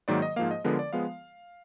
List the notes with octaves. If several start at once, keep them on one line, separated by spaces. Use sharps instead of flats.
G#2 D#3 F#3 A#3 D5
D#5
G#2 F3 A#3 F5
D#5
D3 F3 G#3 B3 A#4
D5
F3 G#3 B3 F5